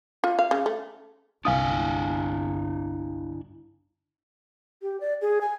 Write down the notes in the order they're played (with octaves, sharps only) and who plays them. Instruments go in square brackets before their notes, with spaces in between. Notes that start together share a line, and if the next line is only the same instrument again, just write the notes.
[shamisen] F4
F5
C#3
A3
[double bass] G1 [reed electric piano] C2 F5 D#6 [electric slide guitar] D4 E4 G#5
[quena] G4
D5
G#4
G#5